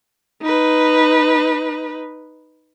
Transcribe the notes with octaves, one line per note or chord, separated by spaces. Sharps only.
D#4 B4